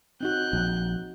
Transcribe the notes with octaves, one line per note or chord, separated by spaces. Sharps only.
C4 D#4 F#4 F#6 G6
A#1